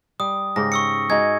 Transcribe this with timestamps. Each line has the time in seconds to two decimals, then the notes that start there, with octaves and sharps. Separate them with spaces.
0.20 G3 D#6
0.56 G#2 C#3 G4 A#6
0.72 C#6 E6 C#7
1.10 G#3 D#4 F#4 G#6